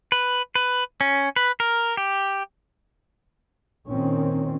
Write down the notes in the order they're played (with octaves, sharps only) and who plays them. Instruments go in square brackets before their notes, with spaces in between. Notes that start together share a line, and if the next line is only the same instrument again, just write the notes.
[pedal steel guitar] B4
B4
C#4
B4
A#4
G4
[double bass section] A#2 D#3 C4 C#4